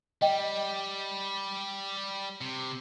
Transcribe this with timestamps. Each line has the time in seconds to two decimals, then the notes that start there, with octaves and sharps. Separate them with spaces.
0.22 G3 D#5 G5
2.41 C3